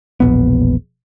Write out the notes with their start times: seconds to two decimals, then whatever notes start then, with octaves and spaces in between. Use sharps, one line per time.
0.20 E1 A#1 B3